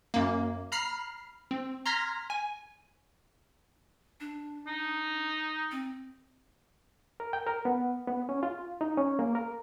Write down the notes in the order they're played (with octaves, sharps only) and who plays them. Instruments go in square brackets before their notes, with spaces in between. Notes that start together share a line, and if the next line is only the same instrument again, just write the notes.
[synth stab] F#2 A#3
A#5 B5 F6 C7
C4
A#5 C6 F6 G#6 A#6 B6
G#5
[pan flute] D4
[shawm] D#4
[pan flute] C4
[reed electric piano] A#4
G5
A#4
B3
B3
C#4
F4
D#4
C#4
A#3
A#4